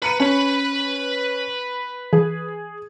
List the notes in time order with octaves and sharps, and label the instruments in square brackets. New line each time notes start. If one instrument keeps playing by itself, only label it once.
[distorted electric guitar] B4 [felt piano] A#5 C#7 D#7
[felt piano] C#4 [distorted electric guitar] B4 B5
[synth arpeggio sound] E3 [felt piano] G#4